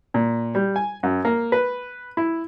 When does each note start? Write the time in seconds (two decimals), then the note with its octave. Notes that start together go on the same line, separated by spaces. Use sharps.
0.14 A#2
0.55 G3
0.76 G#5
1.03 F#2
1.25 A#3
1.52 B4
2.17 E4